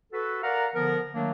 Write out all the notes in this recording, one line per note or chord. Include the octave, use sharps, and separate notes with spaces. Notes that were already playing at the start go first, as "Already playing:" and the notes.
F#4 A4 B4
A#4 D5 F5 F#5 A#5
D3 F3 B3 A#4
D#3 F#3 A3 A#3 D4